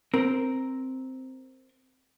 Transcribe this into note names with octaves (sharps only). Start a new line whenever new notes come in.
C4 A#4